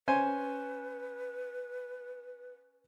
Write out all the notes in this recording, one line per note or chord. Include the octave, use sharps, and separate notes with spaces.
C#4 B4 C5 G#5